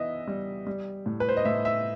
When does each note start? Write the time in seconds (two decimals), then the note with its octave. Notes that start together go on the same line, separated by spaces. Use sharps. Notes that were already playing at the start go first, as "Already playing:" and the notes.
Already playing: E3 B3 D#5 E5
0.27 G3
0.67 G3
1.06 A2
1.20 B4
1.29 C5
1.37 D#5
1.45 A2 E5
1.65 E5